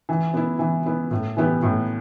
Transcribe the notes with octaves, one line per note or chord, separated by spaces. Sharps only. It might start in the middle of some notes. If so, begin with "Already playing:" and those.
E3
B3 E4
E3
B3 E4
A2
E3 B3 E4 G4
A2